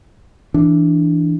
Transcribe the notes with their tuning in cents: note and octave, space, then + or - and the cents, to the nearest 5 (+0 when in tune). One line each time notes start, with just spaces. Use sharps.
E3 +0 D4 +0